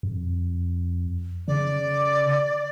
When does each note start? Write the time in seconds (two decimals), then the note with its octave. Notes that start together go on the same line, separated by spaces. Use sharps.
0.03 F2
1.48 C#3 D5